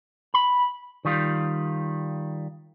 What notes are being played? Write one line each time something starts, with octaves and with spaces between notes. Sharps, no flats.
B5
D#3 G3 F4